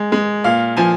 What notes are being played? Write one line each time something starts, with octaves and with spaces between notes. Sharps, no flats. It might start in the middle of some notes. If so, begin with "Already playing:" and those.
Already playing: G#3
G#3
A#2 F5
F3 G#5